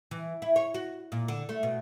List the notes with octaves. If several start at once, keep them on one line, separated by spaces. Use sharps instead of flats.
E3
E4
C#5
F#4
A#2
D3
A3
B2